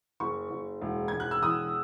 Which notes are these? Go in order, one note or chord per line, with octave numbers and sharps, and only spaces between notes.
F#1 C#6
F#1
E1
E1 G#6
F#6
E6
E2 D#6